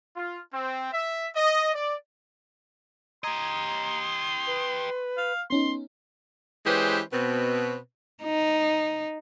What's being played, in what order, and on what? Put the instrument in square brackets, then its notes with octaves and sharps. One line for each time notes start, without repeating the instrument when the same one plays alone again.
[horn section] F4
C4
E5
D#5
D5
[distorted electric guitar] G4 D#5 [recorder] A#5 [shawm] C6 [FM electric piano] D#6 G#6
[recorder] B4
[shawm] F5
[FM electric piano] B3 C#4 D#4 [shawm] C6
[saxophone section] E3 G#3 C#4 G4 B4 C5
B2 C4 B4
[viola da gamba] D#4